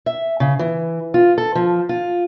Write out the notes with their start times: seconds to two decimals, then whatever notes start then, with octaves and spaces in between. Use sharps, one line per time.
0.06 E5
0.40 C#3
0.59 E3
1.14 F4
1.38 A4
1.55 F3
1.89 F4